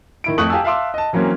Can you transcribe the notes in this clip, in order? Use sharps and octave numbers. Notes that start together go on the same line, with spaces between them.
D#3 E4 D7
F2 A3 C#6 D#6 F#6 F#7
G4 F5 G#5 A5 E6
E5 F5 A5 C6 D6 E6
D#5 A5
E3 F#3 A#3 C4 C#4